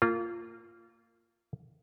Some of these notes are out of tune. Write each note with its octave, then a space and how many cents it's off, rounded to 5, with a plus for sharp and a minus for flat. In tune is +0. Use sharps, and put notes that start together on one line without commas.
A#3 -25 F4 -10